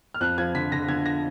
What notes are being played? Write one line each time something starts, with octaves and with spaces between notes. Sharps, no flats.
F6
F2 F#6
F3 G#6
D3 B6
D3 A#6
D3 G#6
A#6